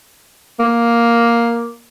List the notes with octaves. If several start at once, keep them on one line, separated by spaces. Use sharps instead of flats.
A#3